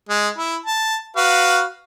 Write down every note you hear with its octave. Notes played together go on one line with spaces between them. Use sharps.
G#3
E4
A5
F#4 B4 F5